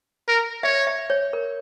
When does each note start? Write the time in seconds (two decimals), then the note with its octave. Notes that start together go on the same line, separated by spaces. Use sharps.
0.28 A#4
0.63 C#5 E5
0.87 E5
1.10 C#5
1.33 A#4